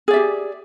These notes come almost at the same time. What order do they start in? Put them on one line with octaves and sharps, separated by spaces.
G#4 D5 E5 G4